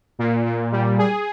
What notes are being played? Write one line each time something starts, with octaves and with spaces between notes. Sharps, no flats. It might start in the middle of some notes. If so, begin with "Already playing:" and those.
A#2
A#2
G3
G#4